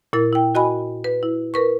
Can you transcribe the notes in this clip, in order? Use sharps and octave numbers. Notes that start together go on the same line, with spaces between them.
A#2 E4 A#4 A6
E4 G5
F#4 D#5 G#5 B5
B4
E4
A#4 B4 C#6